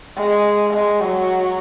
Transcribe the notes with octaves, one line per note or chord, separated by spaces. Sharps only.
G#3
G#3
F#3